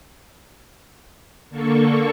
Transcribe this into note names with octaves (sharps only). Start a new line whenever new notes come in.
D3 A#3 A4 C#6